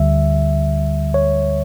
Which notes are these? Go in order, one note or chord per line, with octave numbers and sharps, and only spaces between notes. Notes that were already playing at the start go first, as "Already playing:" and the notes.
Already playing: D2 D3 G3 E5
C#5